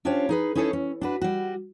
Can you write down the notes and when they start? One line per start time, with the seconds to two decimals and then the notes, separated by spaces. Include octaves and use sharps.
0.05 C#4 D4 F4 G4 C5 C#5
0.29 D#4 G#4 B4
0.55 C#4 D#4 E4 G#4 A4 C#5
0.73 C#4
1.01 D4 F#4 B4
1.21 G3 F#4